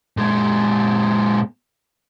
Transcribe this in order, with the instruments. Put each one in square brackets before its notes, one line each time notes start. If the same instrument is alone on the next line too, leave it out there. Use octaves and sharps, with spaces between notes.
[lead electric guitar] A#2 G#3